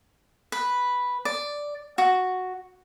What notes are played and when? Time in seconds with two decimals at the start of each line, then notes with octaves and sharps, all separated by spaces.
0.52 B4
1.25 D5
1.98 F#4